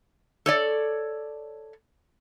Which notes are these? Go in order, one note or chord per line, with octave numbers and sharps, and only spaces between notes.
A4 C#5 D5